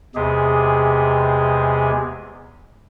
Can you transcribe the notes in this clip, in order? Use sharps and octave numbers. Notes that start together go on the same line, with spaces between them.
E2 C3 G#3 G4 G#4